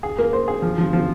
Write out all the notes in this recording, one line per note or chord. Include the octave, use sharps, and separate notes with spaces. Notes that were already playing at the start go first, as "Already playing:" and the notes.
G#4
A#3
C5
G#4
F3
F3
F3